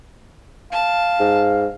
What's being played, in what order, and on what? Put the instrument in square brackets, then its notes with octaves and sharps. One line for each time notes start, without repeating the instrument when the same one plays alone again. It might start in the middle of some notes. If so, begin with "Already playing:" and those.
[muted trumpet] F5 [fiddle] A5
[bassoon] G#2